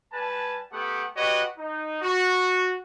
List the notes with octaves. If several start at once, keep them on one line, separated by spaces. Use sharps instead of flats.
G3 B4 G#5 A5
A3 B3 G4 F#5
F#4 G4 B4 C#5 D#5 F#5
D#4
F#4